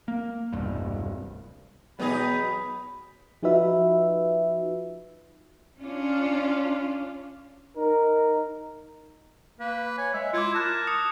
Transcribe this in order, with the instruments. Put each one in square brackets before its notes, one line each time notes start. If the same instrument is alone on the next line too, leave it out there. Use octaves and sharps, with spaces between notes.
[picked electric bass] A#3
E1 C2 G2
[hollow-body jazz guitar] E2 B2 B3 [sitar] F#3 D#4 G#4 [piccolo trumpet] B5
[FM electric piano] F3 D#4 F4 F#4 B4 E5
[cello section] C#4 D4 F4
[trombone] D#4 [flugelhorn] A#4
[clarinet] A#3 [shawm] B4
[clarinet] C#5 [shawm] G#5
[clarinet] G#3 [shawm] E5
[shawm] E4 [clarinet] F4 [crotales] D6 G#6 C#7
[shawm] A#4 [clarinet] A5 [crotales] D6 F#6
[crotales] D#6 C#7